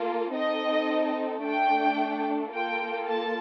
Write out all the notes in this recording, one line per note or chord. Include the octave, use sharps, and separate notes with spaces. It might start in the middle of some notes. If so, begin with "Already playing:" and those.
Already playing: A#3 F4 A4
C4 D#4 A4 D#5
A3 D4 A4 G5
A#3 F4 A4 G5
A5